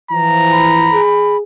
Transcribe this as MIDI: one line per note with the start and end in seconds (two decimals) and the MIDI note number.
0.12 0.99 52
0.12 0.99 53
0.12 1.02 82
0.52 1.37 83
0.93 1.43 68